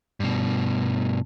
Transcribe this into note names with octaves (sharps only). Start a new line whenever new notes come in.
G2 B2